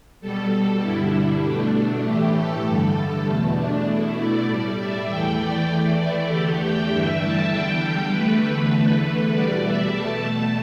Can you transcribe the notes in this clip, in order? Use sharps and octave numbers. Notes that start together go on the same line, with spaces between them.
B2 G3 A4
A4
G2 D3 G3 E4
B2 A3 D4
D4
A2 E3 A3 G4
A4
G2 D3 G3
E2 B2 A3
D4
B2 A3 E4
D5
A2 G3
E5
E2 E3 A3 G5
D5
E2 E3 A3 D5
E4
E2 D3 A3 G4
G5
G2 E3 G3 E5
A5
E2 D3 G3 G5
G4
E2 D3 A3 B4
B4
E2 D3 A3
E2 B2 G3 D5
E5
B2 A3 A5
A5